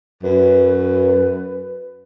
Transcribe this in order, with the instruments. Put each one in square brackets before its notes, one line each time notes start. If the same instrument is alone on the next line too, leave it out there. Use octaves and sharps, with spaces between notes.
[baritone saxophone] F#2 [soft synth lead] B4